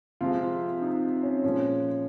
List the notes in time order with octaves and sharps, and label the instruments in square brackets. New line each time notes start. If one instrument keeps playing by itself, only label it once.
[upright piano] C3 F3 G#3 F4
D#4
C#4
A#2 F3 G#3 C#4